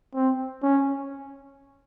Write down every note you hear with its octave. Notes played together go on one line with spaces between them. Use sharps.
C4
C#4